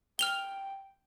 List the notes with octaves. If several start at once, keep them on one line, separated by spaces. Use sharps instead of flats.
G5 F6 F7 G7